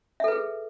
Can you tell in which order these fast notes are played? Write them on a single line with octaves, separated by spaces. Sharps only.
E5 A4 B4 G#4